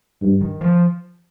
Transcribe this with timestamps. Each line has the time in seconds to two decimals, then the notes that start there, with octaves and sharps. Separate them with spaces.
0.21 G2
0.41 D#3
0.61 F3